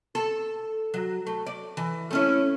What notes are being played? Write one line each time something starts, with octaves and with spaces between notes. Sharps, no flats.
A4
F#3
A3
D5
E3
A3 C#4 E4